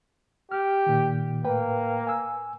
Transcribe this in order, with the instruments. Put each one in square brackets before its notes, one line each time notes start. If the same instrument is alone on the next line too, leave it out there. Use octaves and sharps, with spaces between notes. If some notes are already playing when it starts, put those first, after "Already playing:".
[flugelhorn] G4 [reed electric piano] F6
[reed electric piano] A#2 D#3
[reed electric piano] A2 B4 G5 [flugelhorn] A#3
[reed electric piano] G#5 E6